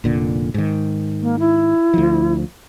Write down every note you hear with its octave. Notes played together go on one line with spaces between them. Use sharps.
F1 A#2 D3
G#2 D#3
A#3
E4
D2 F3